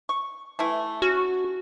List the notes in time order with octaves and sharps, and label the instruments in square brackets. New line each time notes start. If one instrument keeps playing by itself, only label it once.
[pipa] C#6
E3 A3 E4
[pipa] C#4 [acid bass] F#4